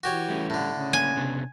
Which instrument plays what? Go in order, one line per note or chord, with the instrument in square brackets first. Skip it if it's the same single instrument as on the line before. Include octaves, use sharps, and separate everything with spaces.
[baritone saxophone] E3 [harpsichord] F#4 G4 C#5
[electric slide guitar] G3 A3 C#4
[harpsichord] A2 D3
[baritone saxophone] C#3
[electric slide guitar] A#3 C#4 [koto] G#5
[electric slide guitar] C3 B3 D4